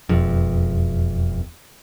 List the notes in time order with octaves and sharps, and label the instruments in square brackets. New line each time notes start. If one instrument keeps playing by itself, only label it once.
[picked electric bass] E1 F2